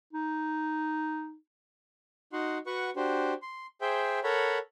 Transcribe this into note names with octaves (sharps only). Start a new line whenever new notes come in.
D#4
D#4 F#4 F#5 C6
F#4 B4 F#5 C#6
D4 F#4 G4 C5
C6
G#4 C5 E5 G5
A4 A#4 C#5 F#5 B5